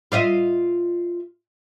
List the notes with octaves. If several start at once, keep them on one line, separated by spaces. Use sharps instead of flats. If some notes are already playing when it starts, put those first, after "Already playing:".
F4 D#5 E5